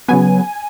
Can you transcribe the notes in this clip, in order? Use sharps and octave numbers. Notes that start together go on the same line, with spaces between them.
C#3 F#3 B3 G#5